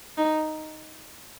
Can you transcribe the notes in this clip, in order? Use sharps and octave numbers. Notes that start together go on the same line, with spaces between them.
D#4